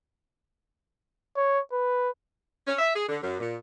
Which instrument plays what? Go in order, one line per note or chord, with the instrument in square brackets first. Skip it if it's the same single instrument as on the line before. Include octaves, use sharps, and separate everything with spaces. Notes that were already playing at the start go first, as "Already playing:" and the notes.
[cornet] C#5
B4
[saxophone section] C#4
E5
G#4
D3
F#2
A#2